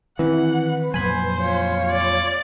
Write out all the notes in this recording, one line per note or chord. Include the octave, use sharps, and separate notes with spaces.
D#3 E3 C4 F#5
B4
F2 A#2 F#3 C5 G#5 B5
F4 C#5
D5